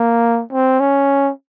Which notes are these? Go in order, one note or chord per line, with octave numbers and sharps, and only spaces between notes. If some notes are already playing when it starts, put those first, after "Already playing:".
Already playing: A#3
C4
C#4